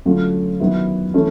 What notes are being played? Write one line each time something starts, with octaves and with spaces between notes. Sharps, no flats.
D3 F#3 A3 C#4 F4
D#3 F#3 B3 E4
E3 A3 C#4